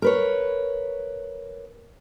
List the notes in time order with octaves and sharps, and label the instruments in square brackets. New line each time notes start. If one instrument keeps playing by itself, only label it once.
[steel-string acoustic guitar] A#4 B4 C#5